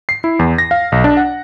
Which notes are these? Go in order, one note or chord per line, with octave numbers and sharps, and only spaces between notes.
C7
E4
E2
A#6
F5
B1
D4
F#5